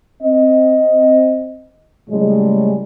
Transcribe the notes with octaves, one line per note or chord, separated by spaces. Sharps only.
C4 D#5
A2 C#3 G3 G#3